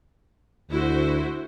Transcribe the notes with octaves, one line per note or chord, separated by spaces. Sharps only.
D2 E4 F#4 C5